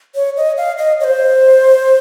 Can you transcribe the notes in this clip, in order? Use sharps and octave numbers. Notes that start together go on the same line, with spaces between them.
C#5
D#5
F5
D#5
C#5
C5